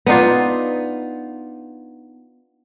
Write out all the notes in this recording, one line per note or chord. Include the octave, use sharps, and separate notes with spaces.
B3 D4 D#4 F4